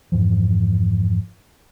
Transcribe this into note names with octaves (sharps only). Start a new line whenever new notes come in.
F2 G#2 E3 F3